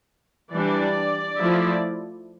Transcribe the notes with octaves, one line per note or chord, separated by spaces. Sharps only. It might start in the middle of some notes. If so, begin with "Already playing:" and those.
E3 G3 D4 D5
F3 A3 E4